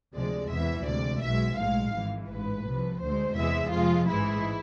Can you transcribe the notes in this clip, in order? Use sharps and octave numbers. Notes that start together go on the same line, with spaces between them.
D2 C3 F3 G#3 D5
E2 C3 E3 E5
D2 C3 G#3 D5
B1 B2 G#3 E5
B1 A2 G#3 F5
G#1 G#2 E3 G#3
A1 G#2 G#3 B4
C2 C3 F3
D2 D3 G#3 C5
E2 C3 E3 G#3 E5
F2 C3 F3 G#3 F4
A1 G#2 E3 G#3 E4